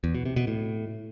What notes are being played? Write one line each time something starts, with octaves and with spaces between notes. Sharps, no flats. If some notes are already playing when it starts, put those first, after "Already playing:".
E2
B2
C3
B2
A2